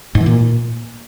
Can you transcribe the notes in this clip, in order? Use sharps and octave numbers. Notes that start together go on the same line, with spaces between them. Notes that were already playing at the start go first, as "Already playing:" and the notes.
G#2
E3
A#2